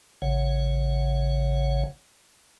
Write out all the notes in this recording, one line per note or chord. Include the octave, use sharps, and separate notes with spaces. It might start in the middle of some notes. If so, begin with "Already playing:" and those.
A1 C#3 C#5 F#5